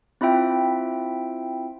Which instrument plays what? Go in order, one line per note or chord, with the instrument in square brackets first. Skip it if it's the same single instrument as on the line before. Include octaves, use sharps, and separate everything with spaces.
[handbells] C4 E4 F4 E5 G5